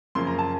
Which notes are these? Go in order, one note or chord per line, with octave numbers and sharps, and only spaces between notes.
F#2 C#3 F3 A#3 C6
A#5
A5